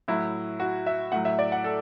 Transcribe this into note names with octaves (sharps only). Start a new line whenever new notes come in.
A2 F#3 E4
F#4
E5
A2 F#3 F#5
E5
D5
F#5
A4